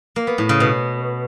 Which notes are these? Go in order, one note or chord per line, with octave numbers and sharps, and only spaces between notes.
A#3
B3
A2
C#3
B2